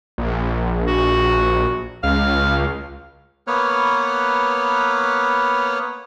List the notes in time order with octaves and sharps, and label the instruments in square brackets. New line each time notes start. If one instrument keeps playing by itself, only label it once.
[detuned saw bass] A#1
[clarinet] F#4
[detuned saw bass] C#2 [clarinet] F5
[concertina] A#3 B3 B4 C#5 F6